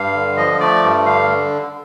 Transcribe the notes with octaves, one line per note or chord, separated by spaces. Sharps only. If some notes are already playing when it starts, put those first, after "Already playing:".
Already playing: G2 F5
D3
F3 D#5
A3 D5
G2
D3 F5